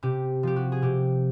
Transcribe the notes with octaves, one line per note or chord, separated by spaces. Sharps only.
C3 G4
F3 G4
F#4
G#4
C3 G4